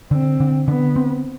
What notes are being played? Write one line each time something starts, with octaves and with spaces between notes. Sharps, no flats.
D3 C4
D3
D3 B3
C4